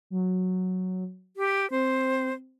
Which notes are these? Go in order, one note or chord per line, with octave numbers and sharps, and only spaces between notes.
F#3
G4 B6
C4 C5